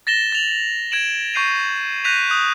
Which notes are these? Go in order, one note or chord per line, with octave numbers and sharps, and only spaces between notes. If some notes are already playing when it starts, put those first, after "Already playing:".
A6 A#6 E7 G7
A6 F7 F#7
G#6 D7 E7 F#7
C#6 G6 C7 D#7 F7
F#6 G6 A#6 B6 D#7 F7
D#6 F#6